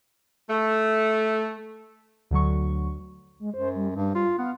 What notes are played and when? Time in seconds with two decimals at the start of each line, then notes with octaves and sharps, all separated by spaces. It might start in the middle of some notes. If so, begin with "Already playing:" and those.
0.50 A3
2.31 D2 D3 F#3 C#6
3.40 G#3
3.54 F#2 C5
3.75 G3
3.96 G2 G3
4.15 F4
4.38 B3 F5